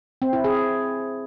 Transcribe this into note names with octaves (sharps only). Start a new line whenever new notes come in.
C4
E4
G#4